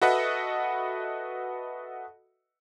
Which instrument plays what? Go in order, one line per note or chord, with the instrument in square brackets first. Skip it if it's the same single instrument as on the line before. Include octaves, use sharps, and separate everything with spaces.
[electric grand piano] F#4 A4 B4 D#5 E5 F#5